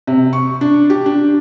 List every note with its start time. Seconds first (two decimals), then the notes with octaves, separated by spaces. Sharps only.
0.07 C3
0.33 C#6
0.61 D4
0.90 G4
1.06 D4